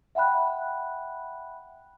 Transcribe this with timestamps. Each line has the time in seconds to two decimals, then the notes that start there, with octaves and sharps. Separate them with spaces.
0.15 E5 F#5 G5 B5 F#6